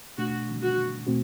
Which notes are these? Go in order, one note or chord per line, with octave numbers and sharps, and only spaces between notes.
B2 A3 D4 F#4
F#4
B2 A3 C4 F#4